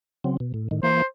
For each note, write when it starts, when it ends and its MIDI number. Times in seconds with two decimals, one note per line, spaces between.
0.24 0.37 49
0.24 0.37 54
0.24 0.37 60
0.40 0.52 47
0.54 0.68 45
0.71 0.80 45
0.71 0.80 51
0.83 1.02 52
0.83 1.02 58
0.83 1.04 72